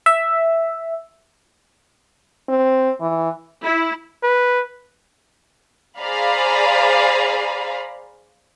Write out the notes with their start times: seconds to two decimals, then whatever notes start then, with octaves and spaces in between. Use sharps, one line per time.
0.06 E5
2.49 C4
3.01 E3
3.65 E4
4.23 B4
5.99 G#4 C5 D5 F5 A#5 B5